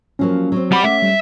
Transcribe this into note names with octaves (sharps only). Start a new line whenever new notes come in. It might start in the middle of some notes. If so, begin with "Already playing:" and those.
F3 F#3 A#3 C#4
F#3 C4
G3 F#5 B5 D6
A3 C#4 E5
G3